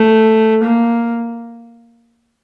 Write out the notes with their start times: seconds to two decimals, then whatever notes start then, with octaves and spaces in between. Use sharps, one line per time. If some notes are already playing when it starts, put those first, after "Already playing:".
Already playing: A3
0.64 A#3